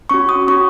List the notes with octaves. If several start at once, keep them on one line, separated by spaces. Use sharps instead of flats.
C#4 F#4 C#6
D#6
C#4 F#4 C#6